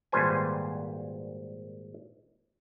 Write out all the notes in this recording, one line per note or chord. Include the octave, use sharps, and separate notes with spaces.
G#1 A#2 G3 B4 C5 G#5